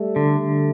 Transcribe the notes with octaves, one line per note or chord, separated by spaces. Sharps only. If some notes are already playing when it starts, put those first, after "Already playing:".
Already playing: G3 A3
D3